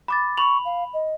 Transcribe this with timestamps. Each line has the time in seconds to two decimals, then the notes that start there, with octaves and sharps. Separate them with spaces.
0.08 B5 D6 A6
0.37 B5 C#6 F7 F#7
0.65 F5
0.93 D#5